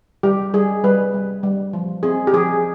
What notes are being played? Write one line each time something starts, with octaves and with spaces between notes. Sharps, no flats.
G3 G4
G3 G#4
G3 B4
G3
G3
F3
C4 G#4
G4
F3 G#4